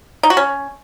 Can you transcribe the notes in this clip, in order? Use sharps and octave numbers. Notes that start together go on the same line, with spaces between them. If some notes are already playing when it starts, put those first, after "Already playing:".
D#4
F#4
C#4